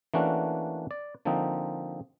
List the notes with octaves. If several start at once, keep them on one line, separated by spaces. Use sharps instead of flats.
E3 A3 A#3 C#4 D4 F#4
D5
D3 F3 A#3 C4 D#4